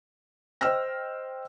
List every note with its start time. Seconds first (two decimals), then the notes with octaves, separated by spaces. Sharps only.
0.61 C5 D#5 G5 E6 F6 A#6